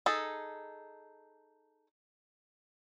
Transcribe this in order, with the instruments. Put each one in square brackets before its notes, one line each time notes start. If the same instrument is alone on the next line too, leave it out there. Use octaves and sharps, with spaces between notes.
[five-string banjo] D#4 G#4 A4